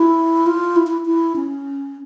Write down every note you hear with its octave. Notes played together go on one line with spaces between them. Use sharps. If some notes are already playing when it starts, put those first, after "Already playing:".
Already playing: E4
F4
E4
E4
E4
C#4